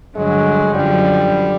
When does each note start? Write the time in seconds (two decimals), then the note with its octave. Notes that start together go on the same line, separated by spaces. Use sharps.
0.16 G2 D3 F#3 G#3
0.75 F#2 D3 F3 G3